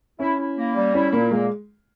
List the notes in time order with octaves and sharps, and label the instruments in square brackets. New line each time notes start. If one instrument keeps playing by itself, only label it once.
[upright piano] C#4 [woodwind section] E4
[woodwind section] E4
A#3
G3
[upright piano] C#4 [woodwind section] E4
[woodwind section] A#2 [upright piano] A#3
[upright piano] G#3 [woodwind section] A#3